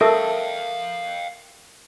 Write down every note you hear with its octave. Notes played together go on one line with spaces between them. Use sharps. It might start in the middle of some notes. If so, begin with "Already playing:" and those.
A4 A#4 E5 F5 G5 D#6